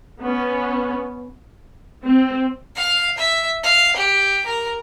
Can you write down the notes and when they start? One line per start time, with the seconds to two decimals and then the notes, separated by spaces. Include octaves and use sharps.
0.20 B3 C#4
2.05 C4
2.75 F5
3.17 E5
3.63 F5
3.96 G4
4.46 A#4